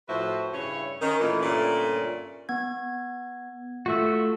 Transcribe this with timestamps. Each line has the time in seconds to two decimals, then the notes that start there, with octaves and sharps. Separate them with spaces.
0.08 A2 F3 F#4 B4 C5 E5
0.53 G2 C#3 E4 C#5
1.01 D#3 C#4
1.20 A#2 E3 A3
1.42 G2 A#2 D3 A3 C#4 D5
2.49 B3 G#6
3.86 A3 F4 F#4 E5 E6